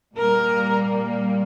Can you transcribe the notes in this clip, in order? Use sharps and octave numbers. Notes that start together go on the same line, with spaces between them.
A#2 G3 A#3 A#4